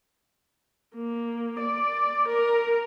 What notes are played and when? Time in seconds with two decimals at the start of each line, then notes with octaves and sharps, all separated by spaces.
0.95 A#3
1.60 D5
2.29 A#4